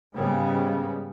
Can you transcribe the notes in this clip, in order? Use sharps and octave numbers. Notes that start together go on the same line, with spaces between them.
G#2 C#3 G3 G#3 B3